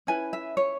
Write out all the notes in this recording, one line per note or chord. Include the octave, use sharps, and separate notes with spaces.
C#4 E4 B4 G#5
E5
C#5